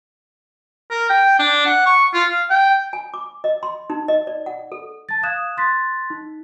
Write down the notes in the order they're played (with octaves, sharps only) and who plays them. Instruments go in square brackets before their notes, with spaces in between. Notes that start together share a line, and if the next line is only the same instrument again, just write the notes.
[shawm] A#4
G5
D4
F#5
C#6
F4
F5
G5
[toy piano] G#5
D6
D#5
C6
D#4
D#5
D5
F#5
A4
[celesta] A5 A6
F5 D#6 F#6 G#6 E7
C6 F#6 A6 B6
D#4